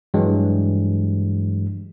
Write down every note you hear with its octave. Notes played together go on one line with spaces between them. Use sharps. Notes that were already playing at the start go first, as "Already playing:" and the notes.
G2 E3 F#3 G#3